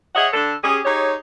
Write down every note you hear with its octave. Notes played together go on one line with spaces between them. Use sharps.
G#4 C#5 D#5 E5 F#5
D3 A4
C#4 G4 G#4
D#4 G4 G#4 C#5